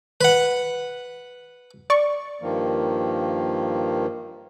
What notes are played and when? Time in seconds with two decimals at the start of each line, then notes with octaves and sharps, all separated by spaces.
0.21 B4 F#5
1.90 D5 C#6
2.42 G2 D#3 F3 A#3